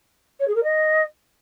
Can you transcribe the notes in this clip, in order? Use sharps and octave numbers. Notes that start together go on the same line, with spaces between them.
C#5
G#4
A#4
D#5